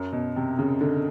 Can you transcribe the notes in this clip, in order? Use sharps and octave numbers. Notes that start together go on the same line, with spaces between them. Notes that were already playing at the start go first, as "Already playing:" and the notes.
Already playing: F#2
B2
C3
C#3
D3